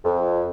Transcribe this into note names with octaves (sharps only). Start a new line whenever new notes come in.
F2